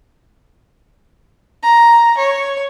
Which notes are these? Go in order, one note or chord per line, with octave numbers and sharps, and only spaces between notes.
A#5
C#5